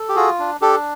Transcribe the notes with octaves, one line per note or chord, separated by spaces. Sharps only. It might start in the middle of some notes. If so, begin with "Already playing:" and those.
Already playing: A4
G4
F4 F#4 G#4
D4
D4 G4 A4